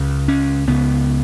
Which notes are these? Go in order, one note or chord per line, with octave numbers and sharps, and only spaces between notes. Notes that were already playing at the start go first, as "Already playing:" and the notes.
Already playing: C#2 C#3
C#4
C#2 C#3 B3